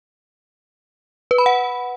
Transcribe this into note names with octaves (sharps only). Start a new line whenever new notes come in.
B4
B5
F#5